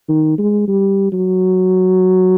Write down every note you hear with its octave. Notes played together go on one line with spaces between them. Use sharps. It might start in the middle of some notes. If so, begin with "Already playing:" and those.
D#3
G#3
G3
F#3